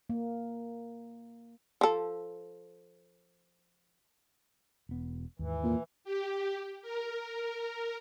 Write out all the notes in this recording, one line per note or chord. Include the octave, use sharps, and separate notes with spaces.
A#3
F3 A4
E1 B3
D#2 G#2 E3
A#2
G4
A#4